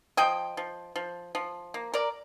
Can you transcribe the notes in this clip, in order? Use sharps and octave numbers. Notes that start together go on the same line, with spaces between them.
F3 D#5 G5
F3
F3
F3
A#3
A#4 D5